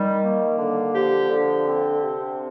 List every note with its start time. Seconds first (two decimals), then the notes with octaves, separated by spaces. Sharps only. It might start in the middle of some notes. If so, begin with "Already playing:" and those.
Already playing: D#3 G3
0.22 A#3
0.59 D3
0.94 F3 G4
1.30 D3
1.66 C4
2.02 C3